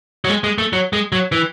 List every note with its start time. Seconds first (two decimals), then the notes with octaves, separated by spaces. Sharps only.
0.25 F#3
0.29 G#3
0.44 G#3
0.58 A3
0.73 F#3
0.93 G#3
1.12 F#3
1.32 E3